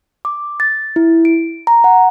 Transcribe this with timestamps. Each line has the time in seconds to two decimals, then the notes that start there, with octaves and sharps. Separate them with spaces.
0.25 D6
0.60 A6
0.96 E4
1.25 D7
1.67 A#5
1.84 F#5